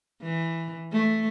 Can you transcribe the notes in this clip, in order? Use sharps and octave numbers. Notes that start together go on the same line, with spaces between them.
E3
A3